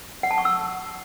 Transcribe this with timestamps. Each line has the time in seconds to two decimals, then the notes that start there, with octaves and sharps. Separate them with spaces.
0.23 F#5
0.31 A5
0.38 C#6
0.45 E6